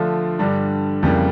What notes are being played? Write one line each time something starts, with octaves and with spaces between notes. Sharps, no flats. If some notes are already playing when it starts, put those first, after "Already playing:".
Already playing: D3 F3 A3 D4 F4
G2 D3 G3 D4
F2 C#3 E3 G3 A#3